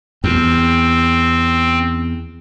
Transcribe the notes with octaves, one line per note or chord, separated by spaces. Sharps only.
E2 C4